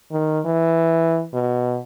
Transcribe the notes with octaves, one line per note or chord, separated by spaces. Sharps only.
D#3
E3
B2